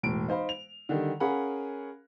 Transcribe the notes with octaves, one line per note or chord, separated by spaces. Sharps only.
E1 A2 D7
D#4 C5 F5 B5
F7
D3 D#3 G3
C#4 G#4 A#4 F5 F#5 B5